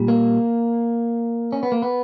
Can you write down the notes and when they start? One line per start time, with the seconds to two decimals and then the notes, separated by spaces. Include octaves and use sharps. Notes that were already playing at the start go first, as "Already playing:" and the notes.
Already playing: A#2 G3
0.08 A#3
1.52 C#4
1.63 B3
1.72 A#3
1.82 B3